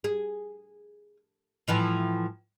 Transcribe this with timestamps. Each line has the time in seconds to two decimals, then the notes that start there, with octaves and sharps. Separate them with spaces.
0.04 G#4
1.68 A2 E3 F3